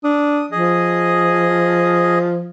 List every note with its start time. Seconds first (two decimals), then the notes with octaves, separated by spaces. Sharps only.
0.04 D4 D#6
0.52 F3 G#4 D#5